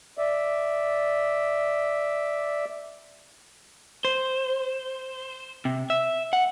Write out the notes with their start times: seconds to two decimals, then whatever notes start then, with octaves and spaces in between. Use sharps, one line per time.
0.18 D5 E5
4.05 C5
5.65 C3
5.90 E5
6.33 F#5